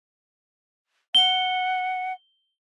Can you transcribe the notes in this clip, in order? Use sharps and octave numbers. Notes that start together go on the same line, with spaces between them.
F#5 G7